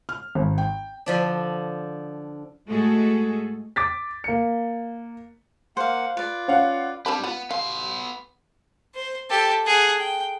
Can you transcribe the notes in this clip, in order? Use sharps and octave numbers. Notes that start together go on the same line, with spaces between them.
F6
G#1
G5
D3 F3 D4
A2 G#3 A3 F#4 G#4 A4
D6 A6 B6
A#3 C#7
A#3 C5 F5 F#5
F4 B4 D5
C#4 F5 F#5
C4 D4 G4 A5 B5
B3 F4 B5
B3 F5 C6
C5
G4 A4
G#4 F#5
G5